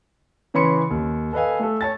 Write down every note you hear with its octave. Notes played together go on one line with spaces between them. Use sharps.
C#3 E3 C#5 B5 C6 C#7
D#2
A4 B4 D#5 F5 G#5
A3 A4
C#5 A5 A6